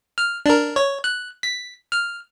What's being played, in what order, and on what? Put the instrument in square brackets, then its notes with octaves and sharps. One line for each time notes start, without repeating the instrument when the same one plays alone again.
[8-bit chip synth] F6
D4 A#4
C#5
F#6
B6
F6